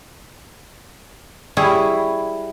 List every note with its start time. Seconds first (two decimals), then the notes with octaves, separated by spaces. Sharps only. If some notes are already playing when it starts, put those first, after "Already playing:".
1.57 G3 E4 G#4 C#5